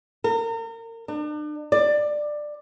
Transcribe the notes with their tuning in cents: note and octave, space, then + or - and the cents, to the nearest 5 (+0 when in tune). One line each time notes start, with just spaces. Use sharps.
A#4 -35
D4 +40
D5 +15